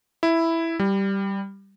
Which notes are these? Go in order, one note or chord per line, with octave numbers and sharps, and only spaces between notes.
E4
G3